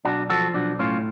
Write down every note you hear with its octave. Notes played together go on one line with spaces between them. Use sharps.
B1 D4 F#4
F3 F#4 A4
B1 D4 F#4
A2 C#4 F4